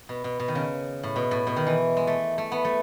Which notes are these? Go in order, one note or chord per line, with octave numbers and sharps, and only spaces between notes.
B2
B2
B2
D#3
C#3
A2
B2
A2
B2
D#3
E3
G#3
A3
A3
B3
A3